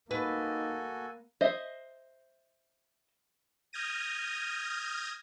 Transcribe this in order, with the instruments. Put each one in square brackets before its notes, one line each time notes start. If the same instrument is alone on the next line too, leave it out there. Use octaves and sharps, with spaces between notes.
[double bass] A#3 [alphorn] D#4 [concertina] F#4 A4 G#5 [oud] B4
[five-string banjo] C5 D#5 E5
[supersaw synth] D#6 F6 G6 G#6 A#6 D#7